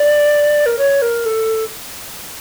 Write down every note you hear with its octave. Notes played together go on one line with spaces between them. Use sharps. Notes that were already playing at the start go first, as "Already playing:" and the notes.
Already playing: D5
A#4
C#5
A#4
A4